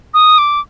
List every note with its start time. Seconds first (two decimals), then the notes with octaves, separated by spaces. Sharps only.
0.14 D#6
0.38 D6